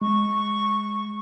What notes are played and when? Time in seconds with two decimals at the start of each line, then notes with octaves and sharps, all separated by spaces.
0.02 G#3 C#6